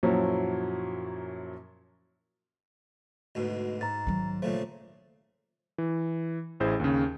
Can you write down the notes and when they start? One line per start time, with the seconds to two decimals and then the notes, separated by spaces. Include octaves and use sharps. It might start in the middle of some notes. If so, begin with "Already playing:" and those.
0.03 F#2 A#2 F3 F#3 C#4 E4
3.35 D2 G#2 B2
3.81 G#2 A#5 A6
4.07 D#3 F#3
4.42 A#2 C#3 A3 C5
5.78 E3
6.60 A1 E4 G#4 C5 G6
6.80 D#2 C#3